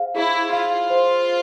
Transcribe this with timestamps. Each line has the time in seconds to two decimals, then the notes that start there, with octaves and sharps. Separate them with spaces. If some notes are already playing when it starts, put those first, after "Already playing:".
Already playing: G#4 C5 F5
0.16 E4 G#4
0.53 F4 F5
0.90 C5